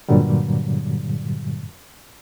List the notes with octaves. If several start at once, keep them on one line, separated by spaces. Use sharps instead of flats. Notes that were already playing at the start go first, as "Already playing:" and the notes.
G2 A#2 D3 F#3 G3